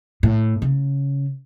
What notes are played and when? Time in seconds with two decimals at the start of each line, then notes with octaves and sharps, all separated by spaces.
0.23 A2
0.62 C#3